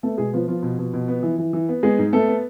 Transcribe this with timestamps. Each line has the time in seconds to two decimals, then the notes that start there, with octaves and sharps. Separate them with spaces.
0.03 A3 B3 A4
0.18 B2 G#3 G#4
0.33 F3 B3 F4
0.48 F3 B3 F4
0.63 B2
0.79 B2
0.94 B2
1.08 B3
1.23 E3
1.38 E3
1.53 E3
1.69 B3
1.83 G#3 B3 G#4
1.99 G#2
2.13 A3 B3 A4
2.28 B3